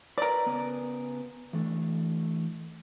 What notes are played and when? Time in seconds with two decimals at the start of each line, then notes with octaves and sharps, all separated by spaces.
0.18 A#4 B4 D5
0.46 C#3 B3 G#5
1.53 E3 A3 D4